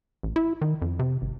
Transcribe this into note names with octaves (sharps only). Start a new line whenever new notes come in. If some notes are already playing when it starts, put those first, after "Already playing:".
A1
E4
D#3
F2
C3
G#1